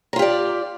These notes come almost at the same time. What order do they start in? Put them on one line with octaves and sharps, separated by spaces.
A#4 F4 G4 D5